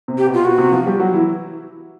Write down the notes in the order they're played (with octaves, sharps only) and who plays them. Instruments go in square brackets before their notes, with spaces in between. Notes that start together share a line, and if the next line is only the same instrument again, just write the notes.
[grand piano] C3 C4
[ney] G4
[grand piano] B2 B3
[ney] F4
[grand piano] B2 B3 [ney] F#4
[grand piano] C3 C4
F3 F4
G3 G4
F#3 F#4
E3 E4